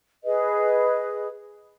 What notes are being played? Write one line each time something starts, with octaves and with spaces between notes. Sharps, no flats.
G#4 B4 D#5